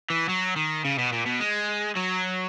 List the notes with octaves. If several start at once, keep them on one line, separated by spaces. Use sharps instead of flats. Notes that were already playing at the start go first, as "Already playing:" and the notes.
E3
F#3
D#3
C#3
B2
A#2
B2
G#3
F#3